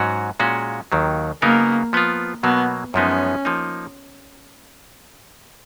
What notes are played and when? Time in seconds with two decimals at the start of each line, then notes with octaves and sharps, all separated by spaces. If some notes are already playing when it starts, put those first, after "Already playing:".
Already playing: G#2 F#3 C#4 F#4
0.40 A#2 G#3 C#4 F#4
0.92 D#2 D#3 F#3
1.42 C#3 F#3 A#3 B3 D#4 A#4
1.93 F3 B3 F4
2.43 B2 F#3 A#3 B3
2.94 F#2 F3 G#3 B3 C#4 D#4
3.45 F3 A#3 D#4